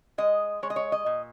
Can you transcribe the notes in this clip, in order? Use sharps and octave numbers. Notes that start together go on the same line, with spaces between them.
G#3 D#5
G#3 C#5
D#5
C#5
D#5
A#2